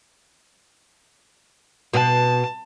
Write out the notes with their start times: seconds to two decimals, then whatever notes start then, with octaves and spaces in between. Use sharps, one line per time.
1.93 B2 A5